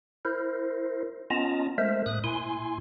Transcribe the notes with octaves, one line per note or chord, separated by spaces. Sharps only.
E4 A#4 C5
B3 C#4 F4 D#5 A5 A#5
G#3 A3 A#4 C5 E5
A2 D#6 F#6
A#2 E4 G#5 C6